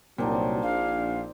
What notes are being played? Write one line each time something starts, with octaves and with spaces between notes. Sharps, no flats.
C2 A#2 F#3 C4 D4 D#4
A#1 F5